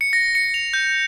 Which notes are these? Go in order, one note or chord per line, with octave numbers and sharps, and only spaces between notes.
C#7
A#6
C#7
F7
G6